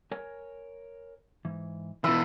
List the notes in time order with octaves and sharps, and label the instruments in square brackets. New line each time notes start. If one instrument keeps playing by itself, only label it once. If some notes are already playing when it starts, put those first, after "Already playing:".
[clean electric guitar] A#4 C#5 G#5
G#2 E3
[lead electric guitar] B2 E3 [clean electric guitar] B5 C6 [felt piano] E6